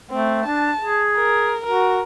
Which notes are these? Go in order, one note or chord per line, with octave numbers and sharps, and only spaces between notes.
A3 C4
D4 A5
G#4
A#4
F#4 A#4